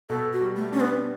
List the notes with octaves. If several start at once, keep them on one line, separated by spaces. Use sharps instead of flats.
B2 A4
F#4
G3
A3
C#4 D4
B3